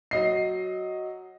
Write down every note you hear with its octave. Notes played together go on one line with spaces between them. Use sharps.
F#3 D#5 C7